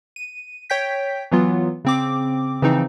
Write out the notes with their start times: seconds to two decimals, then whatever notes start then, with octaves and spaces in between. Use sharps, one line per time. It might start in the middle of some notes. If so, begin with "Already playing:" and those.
0.16 D#7
0.70 C#5 G5 G6 B6
1.31 E3 F#3 B3 F4
1.85 C#3 C4 D6
2.62 C#3 E3 F3 C4 D#4